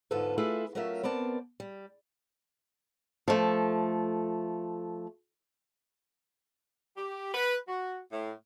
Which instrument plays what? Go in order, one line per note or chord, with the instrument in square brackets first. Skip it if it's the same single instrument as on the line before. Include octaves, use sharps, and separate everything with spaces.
[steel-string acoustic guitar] E2 G#2 D3 F4 A4 B4
A3 E4 F4 G#4 A4 B4
F#3 A3 C#4 F4 A#4 E5
B3 C4 A#4 D5 A5
G3
F3 A3
[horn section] G4
B4
F#4
A2